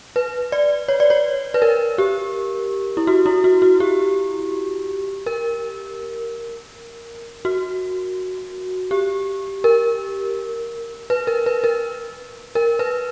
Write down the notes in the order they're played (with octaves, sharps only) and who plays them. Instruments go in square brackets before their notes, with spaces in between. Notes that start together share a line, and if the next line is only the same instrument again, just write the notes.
[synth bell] B4
D5
C#5
D5
C#5
B4
A#4
G4
E4
F#4
E4
F#4
F#4
G4
A#4
F#4
G4
A#4
B4
A#4
B4
A#4
A#4
B4